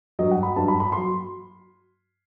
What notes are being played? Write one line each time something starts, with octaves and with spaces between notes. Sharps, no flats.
G2 F#3 D#5
F#5
B5
G2 F#3 A5
B5
B5
F#3 C6